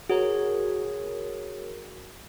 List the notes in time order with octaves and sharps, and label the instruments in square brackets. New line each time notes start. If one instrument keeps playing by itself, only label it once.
[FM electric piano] F#4 A#4 [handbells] G#4 C#5